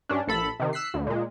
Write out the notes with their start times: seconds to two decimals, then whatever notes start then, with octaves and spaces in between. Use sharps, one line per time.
0.09 G2 C#4 D4
0.27 A#1 A4 B5
0.60 C3 D#3
0.73 E6 F#6 B6 C7
0.94 D2
1.07 A#2 G#3